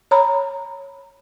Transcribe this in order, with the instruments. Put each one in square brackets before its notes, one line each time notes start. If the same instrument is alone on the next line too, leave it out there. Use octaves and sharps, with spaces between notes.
[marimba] C#5 A#5 B5